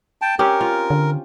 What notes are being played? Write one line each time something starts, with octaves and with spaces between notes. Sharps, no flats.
G5 A5
C4 C#4 G4 A#4
F4
D3